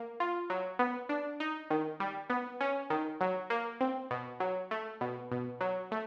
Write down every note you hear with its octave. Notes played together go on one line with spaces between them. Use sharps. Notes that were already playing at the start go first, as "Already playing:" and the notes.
Already playing: A#3
F4
F#3
B3
D4
D#4
D#3
G3
B3
C#4
D#3
F#3
A#3
C4
B2
F#3
A3
B2
B2
F#3
A3